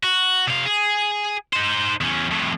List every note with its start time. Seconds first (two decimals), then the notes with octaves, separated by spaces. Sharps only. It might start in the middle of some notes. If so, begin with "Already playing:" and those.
0.03 F#4
0.47 C3 F5
0.66 G#4
1.53 D#4 C5
2.01 E2 C#4
2.31 F2 A2